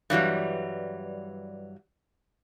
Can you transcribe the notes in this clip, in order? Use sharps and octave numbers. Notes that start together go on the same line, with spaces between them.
G2 E3 F#3 G3